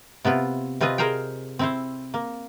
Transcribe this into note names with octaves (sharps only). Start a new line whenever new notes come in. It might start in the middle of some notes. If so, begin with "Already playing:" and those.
C3 B3 E4 F4
C3 C4 F4 B4 D#5
G#4 A#4 C5 F5 G5
C4 E4 C5
A#3